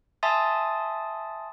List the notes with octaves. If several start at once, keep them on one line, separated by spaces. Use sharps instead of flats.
E5 G#5 A5 C6 D#6 A6